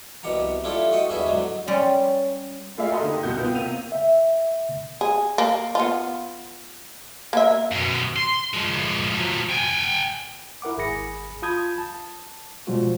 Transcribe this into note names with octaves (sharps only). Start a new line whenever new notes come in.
C2 B2 G4 F#5 A#5
A3 D4 E4 F4 G4 A4
F#4 A4 D#5 F#5 G5
E2 G2 F#4 G#4 E5 B5
G#2 D3 F#3
G3 C#4 C#5 C6
A3 F4 G#4 D5 E5 F5
F#4 A4 A#4 D#5 C6 D#6
D3 A#3 D#4 G4
C2 B2 F#4 G6
B3 F4 G5
C3 A#3 D#7 F7
E5
G#4
A#3
B3 F4
A#3 E5
F#2 B2
C6
F3 G#3
F3 F#3
G5 G#5
E4 A#4 F#5 D6
G#1 G#4 G#5 B5 A#6 C#7
F4 A5 B5 D#6 G6 G#6
A5
B2 F3 G3 G#3 F4 F#4